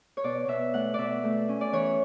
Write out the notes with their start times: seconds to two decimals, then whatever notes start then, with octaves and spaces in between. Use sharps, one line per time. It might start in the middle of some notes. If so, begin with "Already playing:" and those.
0.17 C#5
0.24 B2 D5
0.48 B2 E5
0.74 A3 F#5
0.94 B2 D5 E5
1.24 A3
1.49 C#4
1.61 D5
1.73 E3 C#5